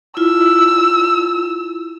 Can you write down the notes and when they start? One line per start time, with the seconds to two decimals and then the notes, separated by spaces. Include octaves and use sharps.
0.17 E4 F4 E6